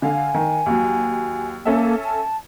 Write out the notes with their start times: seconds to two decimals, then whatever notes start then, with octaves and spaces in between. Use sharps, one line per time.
0.02 D3 F5 G#5
0.34 D#3
0.66 D#2 F#3
1.65 A#3 C#4 A4 E5
2.04 A5